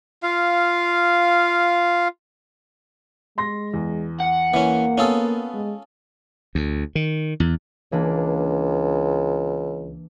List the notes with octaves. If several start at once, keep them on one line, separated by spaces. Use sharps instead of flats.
F4 F5
G#3 C6 A#6
E2
F#5
E3 A#3 C#4
B3 C#4 F4 A4 D#6
G#3
D2
D#3
E2
C#2 E3 A#3 D4